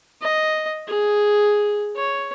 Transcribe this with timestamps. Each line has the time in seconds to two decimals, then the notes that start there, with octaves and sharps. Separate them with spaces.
0.21 D#5
0.88 G#4
1.96 C#5